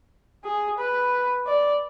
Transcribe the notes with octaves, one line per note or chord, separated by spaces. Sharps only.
G#4
B4
D5